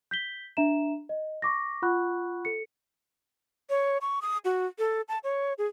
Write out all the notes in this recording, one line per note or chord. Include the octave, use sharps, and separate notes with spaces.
G6 B6 G7
D4 E5 A#5 E7
D#5
C#6 D6 A#6
F4 F#5 B5 C#6 F#6
A4 C#7
C#5
C#6
D#6
F#4
A4
A5
C#5
G#4